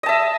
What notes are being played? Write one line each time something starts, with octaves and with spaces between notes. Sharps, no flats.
D#5 E5 A5